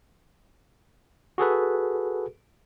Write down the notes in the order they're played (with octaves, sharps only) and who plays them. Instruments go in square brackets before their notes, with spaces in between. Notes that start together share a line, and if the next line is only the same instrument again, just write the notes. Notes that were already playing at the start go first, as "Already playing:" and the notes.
[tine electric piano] F#4 G#4 A4 B4